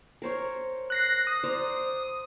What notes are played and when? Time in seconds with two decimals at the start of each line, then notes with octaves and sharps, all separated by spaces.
0.22 A#4 C5 C#5
0.90 F#6 A#6 C7
1.27 D#6
1.44 C5 D5 A#5